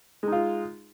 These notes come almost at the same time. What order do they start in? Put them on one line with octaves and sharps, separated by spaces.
G#3 D#4 F4